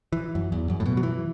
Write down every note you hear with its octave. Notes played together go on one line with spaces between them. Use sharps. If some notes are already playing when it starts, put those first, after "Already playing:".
E3
F#2
E2
F#2
A2
B2
F#3
E3